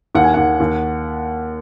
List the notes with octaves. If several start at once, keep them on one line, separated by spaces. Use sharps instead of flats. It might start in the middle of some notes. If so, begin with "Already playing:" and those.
D#2 F#5
G#5
D#2 F#5
D#2